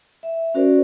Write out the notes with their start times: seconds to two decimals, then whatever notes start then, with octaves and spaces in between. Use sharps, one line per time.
0.23 E5
0.54 C#4 F#4 A#4 C5 D5